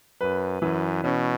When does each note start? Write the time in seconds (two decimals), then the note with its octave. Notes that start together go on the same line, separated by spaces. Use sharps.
0.21 F#2 B4
0.62 F#2 E3
1.04 B2 C#4